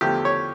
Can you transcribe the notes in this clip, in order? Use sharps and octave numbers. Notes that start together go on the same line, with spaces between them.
E2 D3 F3 A3 G4
C#5